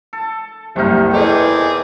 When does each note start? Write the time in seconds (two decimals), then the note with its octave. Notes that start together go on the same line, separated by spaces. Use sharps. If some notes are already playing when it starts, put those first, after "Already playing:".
0.13 A4
0.76 F#1 C2 C3 D#3 D#4 F6
1.14 E2 B2 E3 G#4 A4 C5 D#5 D6